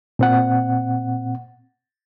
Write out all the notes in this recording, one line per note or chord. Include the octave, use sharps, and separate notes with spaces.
A#2 C4 F#5